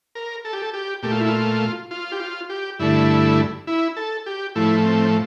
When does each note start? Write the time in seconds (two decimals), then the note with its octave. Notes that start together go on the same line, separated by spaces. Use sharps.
0.15 A#4
0.45 A4
0.53 G4
0.62 A4
0.73 G4
1.03 A#2 A3 G4
1.11 F4
1.20 E4
1.28 F4
1.91 F4
2.12 G4
2.20 F4
2.50 G4
2.79 G2 D3 A3 E4
3.67 E4
3.97 A4
4.26 G4
4.55 A2 F3 A3 E4
4.85 C4